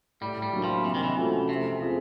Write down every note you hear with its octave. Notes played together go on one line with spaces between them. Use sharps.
A2 G3
G3
F#3 A#3 D4
F3
C3 E3
D#3
E3
F3 A3 C#4 F#4
C3 A3
C4 F4 G#4